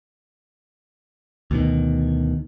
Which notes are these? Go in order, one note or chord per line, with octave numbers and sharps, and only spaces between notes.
D2 B2 D#3